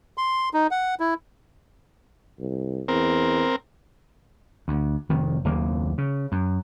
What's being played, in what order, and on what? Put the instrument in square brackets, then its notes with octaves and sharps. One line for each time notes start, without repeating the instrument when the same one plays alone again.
[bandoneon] C6
D#4
F#5
E4
[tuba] C2
[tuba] E2 [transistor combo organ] C4 A#4
[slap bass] D2
F1 D#3
F#1 D#2 A#3
C#3
F#2